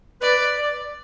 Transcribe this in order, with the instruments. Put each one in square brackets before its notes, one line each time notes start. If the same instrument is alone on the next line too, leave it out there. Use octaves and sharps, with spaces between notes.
[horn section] B4 [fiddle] D5
[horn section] D5